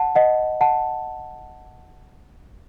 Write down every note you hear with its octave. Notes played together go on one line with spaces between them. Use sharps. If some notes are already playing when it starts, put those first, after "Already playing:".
Already playing: F#5 A5
D#5 F#5
F#5 A5